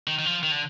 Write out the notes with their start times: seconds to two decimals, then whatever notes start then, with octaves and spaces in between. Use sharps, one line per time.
0.07 D#3
0.19 D#3
0.26 F3
0.43 D#3
0.51 D3